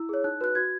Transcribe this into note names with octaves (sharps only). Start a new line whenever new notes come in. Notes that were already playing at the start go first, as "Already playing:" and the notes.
Already playing: E4 E6
G#4 C#5
D#4 F#6
F#4 B4 F#6
F#4 G#6